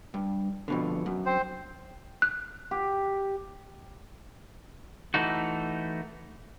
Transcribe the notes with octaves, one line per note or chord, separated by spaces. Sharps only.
G2
F2 B2 D3
F#2
C4 C5
F#6
G4
E3 A3 D#4 F#4